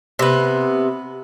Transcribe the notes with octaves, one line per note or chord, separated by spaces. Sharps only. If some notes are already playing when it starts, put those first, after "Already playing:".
C3 B3